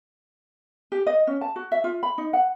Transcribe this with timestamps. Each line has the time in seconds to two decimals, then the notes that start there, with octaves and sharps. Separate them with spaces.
0.92 G4
1.07 D#5
1.27 C#4
1.41 A5
1.56 F#4
1.72 E5
1.84 F4
2.03 B5
2.18 D#4
2.33 F#5